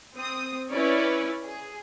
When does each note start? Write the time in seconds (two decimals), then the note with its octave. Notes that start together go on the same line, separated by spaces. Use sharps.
0.15 C4 D#6
0.71 C#4 E4 B4 C#5 D5
1.45 G#4